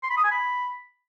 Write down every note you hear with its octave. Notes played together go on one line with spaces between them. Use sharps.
C6
B5
D#6
G#5
B5